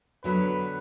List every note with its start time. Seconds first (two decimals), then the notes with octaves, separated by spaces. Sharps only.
0.24 D3 F#3 B3 B4